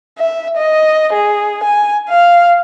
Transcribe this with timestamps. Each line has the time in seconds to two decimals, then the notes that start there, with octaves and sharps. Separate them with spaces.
0.18 E5
0.58 D#5
1.13 G#4
1.64 G#5
2.09 F5